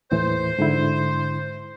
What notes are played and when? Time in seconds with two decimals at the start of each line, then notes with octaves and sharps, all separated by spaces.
0.12 D#2 A2 E3 C5
0.59 G#2 D3 E4